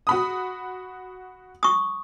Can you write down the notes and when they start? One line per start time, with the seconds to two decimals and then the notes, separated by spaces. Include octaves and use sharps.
0.07 F#4 B5 D#6
1.63 C#6 D#6